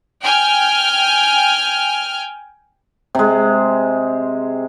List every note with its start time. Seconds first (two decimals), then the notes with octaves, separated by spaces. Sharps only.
0.22 G5 G#5 F6
3.15 C3 G#3